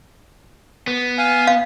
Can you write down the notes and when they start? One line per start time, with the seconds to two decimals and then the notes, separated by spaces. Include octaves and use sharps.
0.87 B3
1.18 F5 G#5
1.47 F5